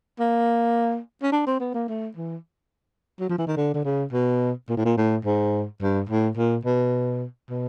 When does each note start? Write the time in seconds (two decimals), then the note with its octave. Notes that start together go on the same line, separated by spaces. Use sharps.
0.19 A#3
1.23 C#4
1.32 D4
1.47 C4
1.60 B3
1.74 A#3
1.88 A3
2.17 E3
3.20 F#3
3.29 F3
3.38 E3
3.47 D#3
3.57 D3
3.74 D3
3.84 C#3
4.12 B2
4.69 A#2
4.77 A2
4.85 A#2
4.97 A2
5.25 G#2
5.82 G2
6.09 A2
6.37 A#2
6.65 B2
7.50 B2